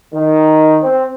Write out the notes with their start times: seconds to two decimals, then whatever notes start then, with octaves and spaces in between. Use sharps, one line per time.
0.14 D#3
0.83 C4